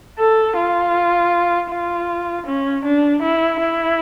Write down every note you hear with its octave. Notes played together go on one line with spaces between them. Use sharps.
A4
F4
F4
C#4
D4
E4
E4